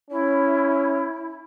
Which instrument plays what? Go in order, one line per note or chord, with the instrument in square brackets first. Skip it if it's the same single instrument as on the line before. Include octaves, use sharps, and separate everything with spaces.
[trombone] C#4 [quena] E4